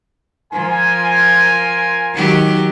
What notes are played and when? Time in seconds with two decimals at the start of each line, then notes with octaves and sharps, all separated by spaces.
0.53 F3 F4 A#4 G#5
2.14 D#3 F#3 G4